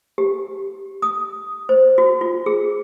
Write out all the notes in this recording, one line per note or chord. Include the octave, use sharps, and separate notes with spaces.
G4
D#6
C5
F#4
F4
G#4